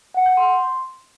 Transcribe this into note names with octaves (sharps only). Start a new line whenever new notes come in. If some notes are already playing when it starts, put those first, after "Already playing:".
F#5
G6
C6